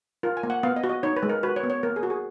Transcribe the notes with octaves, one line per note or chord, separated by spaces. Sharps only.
F4 A#4
G#5
A#3
F#5
B3 F5
D#5
F#4
D#5
D#4 C#5
B4
G#3
A#4
F#4 B4
C#5
B3
C#5
A#3 A#4
G#4
F#4
G#4